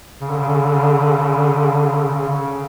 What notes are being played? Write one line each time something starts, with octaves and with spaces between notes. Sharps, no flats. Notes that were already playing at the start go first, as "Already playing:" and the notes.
C#3
D3
C#3
D3
C#3
D3
C#3
D3
C#3
D3
C#3
D3
C#3
D3
C#3
D3
C#3
D3
C#3
D3
C#3
D3
C#3